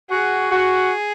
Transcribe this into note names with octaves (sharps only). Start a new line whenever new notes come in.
F#4 G#4
F#4